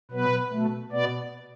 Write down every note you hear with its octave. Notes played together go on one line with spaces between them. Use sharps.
B2 F#3 B3 B4
B2 A3
B2 B3 D5